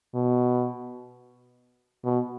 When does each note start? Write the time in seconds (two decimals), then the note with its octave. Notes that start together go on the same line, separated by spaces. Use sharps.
0.15 B2
2.04 B2